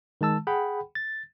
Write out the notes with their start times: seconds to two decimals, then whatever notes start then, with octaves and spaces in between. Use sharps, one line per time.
0.21 D#3 G#3 A5 E6
0.47 G#4 F#5 G5 B5
0.95 A6